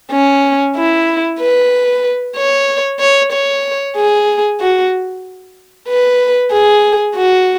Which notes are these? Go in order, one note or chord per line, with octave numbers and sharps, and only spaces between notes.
C#4
E4
B4
C#5
C#5
C#5
G#4
F#4
B4
G#4
F#4